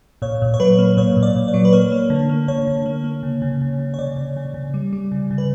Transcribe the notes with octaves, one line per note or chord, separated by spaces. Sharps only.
A#2 C#5
A#2
C#5
F#3 B4
A#3
A#2 C#5
A#2
D5
A#2
D5
F#3
B4
A#3 C#5
A#3
D3
A#3
D3 C#5
D3
A#3
A#3
C#3
C#3
C#3
C#3
C#5
C#3 D5
C#3
C#3
C#3
G3
G3
C#3
C#3
B4